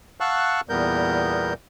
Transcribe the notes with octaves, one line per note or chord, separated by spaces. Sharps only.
F5 F#5 A5 C#6 E6 F#6
E2 A#2 G3 B3 A#4 G6